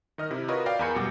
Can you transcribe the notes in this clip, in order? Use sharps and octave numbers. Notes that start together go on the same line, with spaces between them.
D#3 D#5 F6
C3 E4
F4 F#4 A#4 B4 C#5 D#5
D5 F5 G5
E2 A#4 G#5 B5 G6 C#7
F#2 B2 G3 F#5 G5 D6